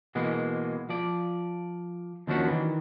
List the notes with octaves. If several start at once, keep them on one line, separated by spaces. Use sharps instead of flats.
B2 E3 G#3 A#3
F3 D5
D#2 F3 F#3 C#4 D4 F#4
D#3 E3